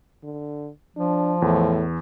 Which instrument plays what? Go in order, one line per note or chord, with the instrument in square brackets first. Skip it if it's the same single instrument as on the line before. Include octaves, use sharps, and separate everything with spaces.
[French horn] D3
[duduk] F3 [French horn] D4
[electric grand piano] E2 [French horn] A2